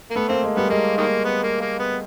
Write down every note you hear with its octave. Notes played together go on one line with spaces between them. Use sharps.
A#3
A3 B3
A#3 C4
G#3
G3 B3
G#3 A#3
D#3 A#3
B3
A#3
A#3
B3